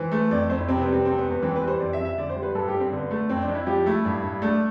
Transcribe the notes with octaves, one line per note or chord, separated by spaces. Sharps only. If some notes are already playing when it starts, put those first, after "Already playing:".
Already playing: E3 C5
A3
F2 D5
F2 C5
E4
C3 C4
B3
G3
C4
E2 C4
B3
E2
B3
E3 C4
B4
G3
C5
F2 D5
E5
F2
E5
D3 D5
C5
G3
B4
G2 A4
G4
G2
C4
D3 B3
A3
F2 C4
D4
F2
E4
F3 G4
A3 E4
G2
G2
A3 D4